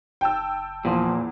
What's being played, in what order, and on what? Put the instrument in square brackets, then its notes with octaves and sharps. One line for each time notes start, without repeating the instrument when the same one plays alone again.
[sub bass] F#1 [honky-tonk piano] G5 A5 E6
[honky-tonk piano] E2 [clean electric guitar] A#2 [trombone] F3